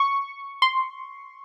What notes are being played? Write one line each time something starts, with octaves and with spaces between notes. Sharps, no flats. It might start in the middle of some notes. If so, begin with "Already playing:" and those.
Already playing: C#6
C6